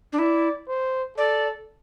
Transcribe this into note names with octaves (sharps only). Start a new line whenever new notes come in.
D4
E4 D5
C5
A4 D5